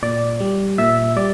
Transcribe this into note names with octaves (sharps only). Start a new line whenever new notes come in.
A#2 D5
G3
A#2 E5
G3 D5